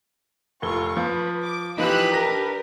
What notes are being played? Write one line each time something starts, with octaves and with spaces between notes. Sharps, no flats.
F1 F4 A4 C#6 G7
F3 B4
D6
E3 F3 D#4 G4 B4 E6 F#6
D4 A#4 A#5 A#6